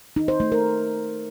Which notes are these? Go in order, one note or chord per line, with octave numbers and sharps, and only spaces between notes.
D#4
C5
A3
A#4